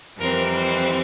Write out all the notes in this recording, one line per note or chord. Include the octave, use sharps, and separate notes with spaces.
F2 E3 G3 C4 A#4
C5